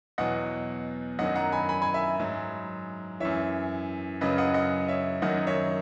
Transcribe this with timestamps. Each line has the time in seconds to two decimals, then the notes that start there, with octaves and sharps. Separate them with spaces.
0.18 E2 B2 F#3 D#5 F#5
1.19 F#2 D#3 F#3 D#5 F#5
1.36 F#5 A#5
1.52 G#5 B5
1.69 G#5 B5
1.82 G#5 B5
1.94 E5 G#5
2.19 G#2 F#3
3.20 F#2 E3 C#5 E5
4.21 F#2 C#3 F#3 B4 D#5
4.38 D#5 F#5
4.54 D#5 F#5
4.88 C#5 E5
5.22 F#2 D#3 F#3 D#5 F#5
5.47 C#5 E5